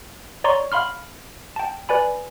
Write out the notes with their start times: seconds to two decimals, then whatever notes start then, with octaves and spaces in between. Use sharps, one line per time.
0.44 C#5 D5 A#5 C6 C#6
0.72 F5 B5 C6 F6
1.56 G5 A5
1.89 B4 D5 G#5 B5